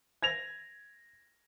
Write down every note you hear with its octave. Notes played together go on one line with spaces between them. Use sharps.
G#6 A#6 F7